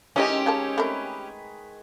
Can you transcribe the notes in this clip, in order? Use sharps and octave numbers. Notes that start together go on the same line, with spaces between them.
D#3 E3 G#3 C4 C#4 D#4 G4 D#5
C#3 G#4 A#4 A5
A3 C4 A#4 B4 B5 C#6